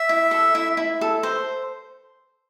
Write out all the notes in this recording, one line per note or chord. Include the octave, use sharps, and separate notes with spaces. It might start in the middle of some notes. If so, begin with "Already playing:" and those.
Already playing: E5
E4
A4
E4
E4
A4
C5